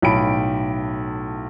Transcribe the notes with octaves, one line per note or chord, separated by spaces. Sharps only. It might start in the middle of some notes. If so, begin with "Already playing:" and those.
B1 A2 G5 B5 D7